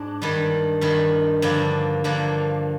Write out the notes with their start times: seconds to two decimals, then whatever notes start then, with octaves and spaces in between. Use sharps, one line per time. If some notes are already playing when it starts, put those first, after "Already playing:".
Already playing: G#2 D4
0.22 G2 D#3 G3
0.81 G2 D#3 G3
1.42 G2 D3 F3 A#3
2.04 G2 D3 F3 A#3